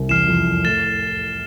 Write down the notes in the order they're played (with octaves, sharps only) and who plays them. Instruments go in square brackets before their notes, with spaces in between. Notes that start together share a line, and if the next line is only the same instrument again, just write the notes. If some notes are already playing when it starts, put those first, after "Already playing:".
Already playing: [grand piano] C2 C3
[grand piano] E2 E3 [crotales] F6 C7 E7
[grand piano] F2 F3
[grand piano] A2 A3 [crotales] A6 E7 G7